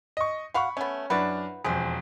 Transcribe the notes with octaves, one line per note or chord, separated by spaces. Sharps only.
D#5 C#6
F#4 F5 F#5 B5 C#6
A3 B3 C#4
F#2 D4 E4 F#4 B4
E1 F2 G#4 C5